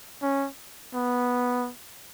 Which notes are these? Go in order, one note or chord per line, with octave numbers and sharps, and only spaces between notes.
C#4
B3